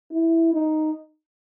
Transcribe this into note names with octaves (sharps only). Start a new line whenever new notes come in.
E4
D#4